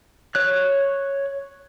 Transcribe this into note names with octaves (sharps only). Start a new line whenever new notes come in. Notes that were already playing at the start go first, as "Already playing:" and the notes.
C#5 F#6